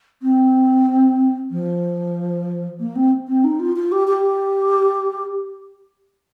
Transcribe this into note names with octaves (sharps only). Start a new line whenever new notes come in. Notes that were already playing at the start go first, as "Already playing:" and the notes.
C4
F3
A#3
C4
C4
D#4
F4
F4
G4
G4